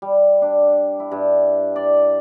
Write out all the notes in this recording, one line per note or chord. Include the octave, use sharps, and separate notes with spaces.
G3
D4
E4
G2
D5